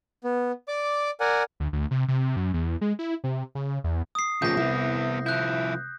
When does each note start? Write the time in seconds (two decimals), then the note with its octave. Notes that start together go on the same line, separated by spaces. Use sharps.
0.24 B3
0.68 D5 D6
1.20 A#4 D5 F#5 G#5
1.60 D2
1.73 D2
1.91 C3
2.08 C3
2.36 F#2
2.54 E2
2.81 G#3
2.99 E4
3.24 C3
3.55 C#3
3.84 E2
4.15 D#6 C7
4.42 A#1 A2 C#3 G6 A#6
4.57 C2 B3 E4
5.26 F3 E4 F#6 G6